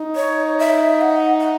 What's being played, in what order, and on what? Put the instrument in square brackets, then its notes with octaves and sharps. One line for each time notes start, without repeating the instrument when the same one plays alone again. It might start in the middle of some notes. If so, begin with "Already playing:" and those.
Already playing: [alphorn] D#4
[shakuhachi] C#5
E5
F#5
F#5